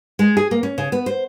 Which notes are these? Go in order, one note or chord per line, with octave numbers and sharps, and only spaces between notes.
G#3
G#4
A#3
C#4
C#3
B3
C5